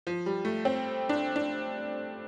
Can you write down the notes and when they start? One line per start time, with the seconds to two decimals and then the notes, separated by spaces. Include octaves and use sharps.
0.07 F3
0.26 G3
0.45 A3
0.65 C4
1.09 D4
1.36 D4